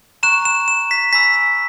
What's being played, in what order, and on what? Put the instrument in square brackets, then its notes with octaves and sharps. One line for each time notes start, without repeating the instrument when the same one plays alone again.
[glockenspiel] A#5 C#6 F#6 E7
E7
E7
B6
G#5 B5 E6 B6